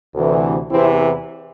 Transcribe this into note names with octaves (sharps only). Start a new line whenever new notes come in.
D2 C3 E3
E2 C3 E3 C4 E4